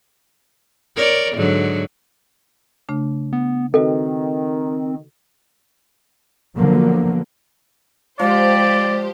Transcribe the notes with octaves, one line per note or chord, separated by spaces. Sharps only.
A#4 C#5 D5
G#2 D3 F#3
C#3 A3 D4
B3
D#3 C4 F#4 A4 B4 D#5
D3 F3 F#3 A#3 B3
F3 G#3 G4 C5 D5